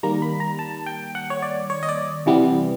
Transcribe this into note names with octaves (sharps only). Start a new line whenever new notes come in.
D#3 G3 A#3 A#5
B5
A#5
A5
G5
F#5
C#5
D5
C#5
D#5
D5
C3 E3 G3 B3